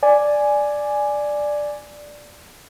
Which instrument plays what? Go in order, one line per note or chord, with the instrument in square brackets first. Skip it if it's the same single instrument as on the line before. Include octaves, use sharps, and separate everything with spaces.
[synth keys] D5 G#5